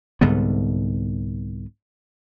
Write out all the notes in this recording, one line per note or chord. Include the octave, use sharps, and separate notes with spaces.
C2 G#2 D3 B3